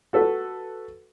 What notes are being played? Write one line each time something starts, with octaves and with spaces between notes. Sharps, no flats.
F#4 A4 B4